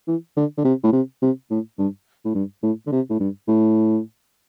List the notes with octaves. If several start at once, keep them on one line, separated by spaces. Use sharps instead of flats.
E3
D3
D3
C3
A2
C3
C3
A2
G2
A2
G2
A2
D3
C3
A2
G2
A2